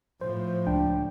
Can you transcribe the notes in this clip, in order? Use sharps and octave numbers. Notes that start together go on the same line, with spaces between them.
A2 F3 C5
C#2 D4 G5